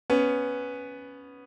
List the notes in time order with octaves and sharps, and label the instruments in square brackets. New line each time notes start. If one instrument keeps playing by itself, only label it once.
[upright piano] B3 C#4